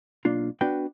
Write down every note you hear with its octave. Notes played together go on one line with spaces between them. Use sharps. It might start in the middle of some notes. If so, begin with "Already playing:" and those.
B1 A#3 D4 F4
B3 D4 F#4 B4 G5